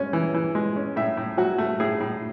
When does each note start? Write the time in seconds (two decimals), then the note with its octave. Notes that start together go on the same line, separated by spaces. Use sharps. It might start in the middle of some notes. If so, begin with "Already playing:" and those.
Already playing: G#3 C#4
0.13 E3
0.34 E3
0.55 G#3
0.76 C#4
0.96 A2 E5
1.17 A2
1.37 F#3 F#4
1.58 A3
1.80 A2 G#4
2.00 A2